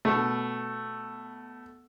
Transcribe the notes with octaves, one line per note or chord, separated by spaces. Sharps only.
B2 A3